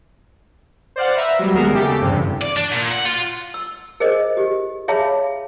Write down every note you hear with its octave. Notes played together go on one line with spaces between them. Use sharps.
C5 D5 F5 F#5
B4 E5 A#5
F#3 G3
D#2 G#3 B3 A#4 C7 E7
C#3 A3 G4
E2 G2 C3
D5
D4
A#2
F#5
F4
E6
G#4 A#4 C5 D#5
G4
G#4 C#5 E5 F5 A5 B5